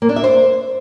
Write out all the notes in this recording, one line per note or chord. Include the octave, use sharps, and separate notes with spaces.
A#3
D4
E5
C5